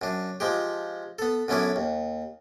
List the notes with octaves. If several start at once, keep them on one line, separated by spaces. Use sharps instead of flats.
F#2 D4
F3 G#3 G4
B3 A4
F#2 D3 B3 C#4 E4 D5
D#2